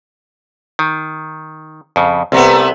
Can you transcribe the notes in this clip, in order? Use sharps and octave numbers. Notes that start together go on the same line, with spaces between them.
D#3
F2 C#3
C2 C3 A3 B3